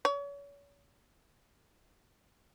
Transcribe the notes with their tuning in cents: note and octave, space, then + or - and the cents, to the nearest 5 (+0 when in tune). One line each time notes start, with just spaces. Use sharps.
C#5 +35